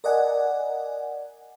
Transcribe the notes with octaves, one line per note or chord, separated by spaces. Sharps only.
A#4 D5 D#5 F#5 G#5